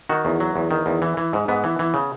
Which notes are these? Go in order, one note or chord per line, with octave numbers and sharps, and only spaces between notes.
D#3 F#4
E2
F#3
E2
D#3
E2
E3
E3
G#2
G#2 B3
E3
E3
C#3